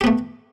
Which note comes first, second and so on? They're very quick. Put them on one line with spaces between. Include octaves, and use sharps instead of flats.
G4 B3 A3